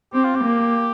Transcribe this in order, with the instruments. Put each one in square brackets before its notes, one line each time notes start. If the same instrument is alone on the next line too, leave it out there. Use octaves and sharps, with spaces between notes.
[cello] C4 [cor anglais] G4
[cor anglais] F4
G4
[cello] A#3